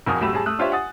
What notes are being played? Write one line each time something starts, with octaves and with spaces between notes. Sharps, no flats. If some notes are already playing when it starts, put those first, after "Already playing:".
E1 F2 F#4 A#4 G#5 D#6
A2 F#3 A3 G4 B5 E7
A2 G3 G#4 A5
A3 D#6 F#6
D4 F4 G4 C5 C#5 E5
F#5 G#5 D#6 A6